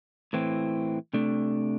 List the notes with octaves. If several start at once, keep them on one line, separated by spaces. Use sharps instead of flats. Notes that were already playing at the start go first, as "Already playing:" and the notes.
A2 E3 C4
C3 A3 D4